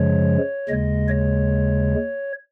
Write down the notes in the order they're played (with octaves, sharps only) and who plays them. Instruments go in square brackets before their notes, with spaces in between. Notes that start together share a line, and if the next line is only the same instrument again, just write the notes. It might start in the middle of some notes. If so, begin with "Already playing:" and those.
Already playing: [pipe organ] F#2 C#3 F3 G#3 C#5
D#2 C#3 G#3 D#5
C#5